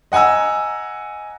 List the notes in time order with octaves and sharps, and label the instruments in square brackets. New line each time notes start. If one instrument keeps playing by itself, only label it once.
[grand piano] D#5 F#5 G#5 A#5 E6